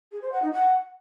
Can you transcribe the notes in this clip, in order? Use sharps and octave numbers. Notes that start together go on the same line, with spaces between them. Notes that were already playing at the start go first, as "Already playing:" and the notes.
G#4
C5
F#5
D#4
F#5